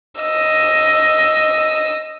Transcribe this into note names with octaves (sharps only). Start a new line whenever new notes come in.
D#5 E6